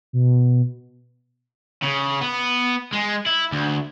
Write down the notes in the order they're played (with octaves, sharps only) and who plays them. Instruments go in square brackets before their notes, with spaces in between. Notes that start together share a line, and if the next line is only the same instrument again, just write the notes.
[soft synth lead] B2
[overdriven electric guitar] C#3
B3
G#3
E4
D2